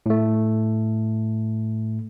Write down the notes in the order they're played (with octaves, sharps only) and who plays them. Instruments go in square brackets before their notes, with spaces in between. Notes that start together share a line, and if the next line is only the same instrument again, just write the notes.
[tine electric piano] A2 A3